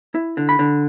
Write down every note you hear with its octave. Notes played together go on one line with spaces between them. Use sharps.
E4
D3
B5
D3